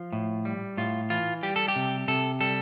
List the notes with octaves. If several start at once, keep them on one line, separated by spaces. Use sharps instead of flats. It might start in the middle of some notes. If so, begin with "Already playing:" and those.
Already playing: F3 F4
A2
G3
A2 F4
E3 F4
G3 G4
A4
G4
C3
C3 A4
G3 A4